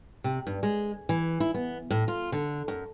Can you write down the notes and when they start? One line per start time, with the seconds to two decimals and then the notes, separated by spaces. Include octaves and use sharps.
0.24 C3
0.47 G2
0.63 G#3
1.09 E3
1.40 E4
1.54 B3
1.91 A2
2.08 F4
2.32 D3
2.68 F#2